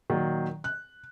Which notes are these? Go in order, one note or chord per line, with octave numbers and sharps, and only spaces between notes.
A#2 D#3 F#3
F#6